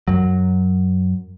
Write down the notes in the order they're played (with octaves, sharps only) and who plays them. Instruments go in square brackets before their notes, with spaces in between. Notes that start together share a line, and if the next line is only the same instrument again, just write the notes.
[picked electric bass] F#2 F#3